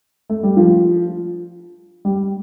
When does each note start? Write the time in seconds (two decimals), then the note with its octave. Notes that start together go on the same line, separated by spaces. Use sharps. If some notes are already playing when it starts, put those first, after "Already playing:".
0.29 A3
0.43 G3
0.57 F3
2.05 G3